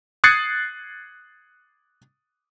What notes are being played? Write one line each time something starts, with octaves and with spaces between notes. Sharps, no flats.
D#6 F#6 G#6 A6 C7 C#7